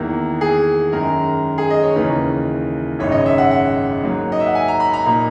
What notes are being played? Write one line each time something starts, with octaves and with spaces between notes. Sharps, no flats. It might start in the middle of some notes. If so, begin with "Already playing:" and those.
Already playing: E2 D#3 A#3 E4
G#4
F#2 D#3 G#3 A#4
G#4
D#5
C#5
D#2 C#3 E3 A#3 D#4 B4
G#1 F#2 C#3 G#3 D#4 C#5
D#5
E5
F#5
F#5
G#2 F#3 A#3
D#5
E5
F#5
G#5
A#5
B5
A#5
A#2 A#3 D#4 B5